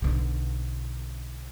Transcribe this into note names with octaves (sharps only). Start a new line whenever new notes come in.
B1 D3